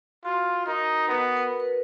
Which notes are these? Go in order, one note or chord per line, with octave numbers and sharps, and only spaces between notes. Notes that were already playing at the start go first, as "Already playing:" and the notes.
F4 F#4
D#4 A#4
B3 B4
A#4
B4
A#4